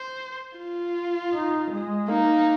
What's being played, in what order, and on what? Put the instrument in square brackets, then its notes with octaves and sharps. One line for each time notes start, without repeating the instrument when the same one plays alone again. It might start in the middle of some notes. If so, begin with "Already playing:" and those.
Already playing: [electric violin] C5
F4
[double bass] D#4
G#3
[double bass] A#3 [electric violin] D#4